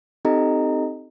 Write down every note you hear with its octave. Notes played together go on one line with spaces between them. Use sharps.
C4 D#4 G4 A4 D#5 A#5